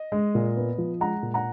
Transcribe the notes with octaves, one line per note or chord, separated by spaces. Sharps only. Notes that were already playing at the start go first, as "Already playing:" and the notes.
Already playing: D#5
G#3
A#2
B3
F3
G#3 F#5 A#5
A#2
F#5 A#5